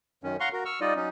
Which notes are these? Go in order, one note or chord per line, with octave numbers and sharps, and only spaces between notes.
F#2 D#3 C#4
F5 F#5 A#5 C6 C#6
F#4 A#4
C#6 E6 F6
G3 D#4 F4 D5 D#5
F#3 C#4 D#4